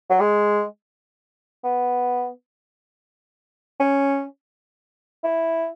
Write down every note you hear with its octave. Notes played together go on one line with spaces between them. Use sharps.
F#3
G#3
B3
C#4
E4